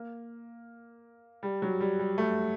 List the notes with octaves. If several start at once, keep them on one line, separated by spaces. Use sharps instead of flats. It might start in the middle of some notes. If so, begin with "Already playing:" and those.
Already playing: A#3
G3
F#3
G3
G3
A3